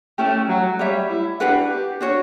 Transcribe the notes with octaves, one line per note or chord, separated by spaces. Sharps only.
A3 C#4 E4 G4 C#5
F#3
G3 G4 C#5 E5
E4
D4 F#4 G4 B4 F#5
G4
D4 F#4 C#5